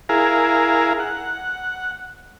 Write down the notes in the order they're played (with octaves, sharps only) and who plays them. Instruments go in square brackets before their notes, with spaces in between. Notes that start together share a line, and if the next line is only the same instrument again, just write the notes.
[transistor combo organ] E4 G#4 A#4 F5
F#5